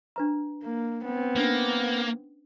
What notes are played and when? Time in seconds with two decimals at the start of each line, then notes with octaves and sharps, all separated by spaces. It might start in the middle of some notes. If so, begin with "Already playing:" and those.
0.16 D4 B4 A#5
0.63 A#3
1.05 B3 C4
1.36 A#3 C#4 D4 B4